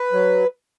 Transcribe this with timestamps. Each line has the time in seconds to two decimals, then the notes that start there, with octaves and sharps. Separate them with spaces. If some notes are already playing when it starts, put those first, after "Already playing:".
Already playing: B4
0.12 F#3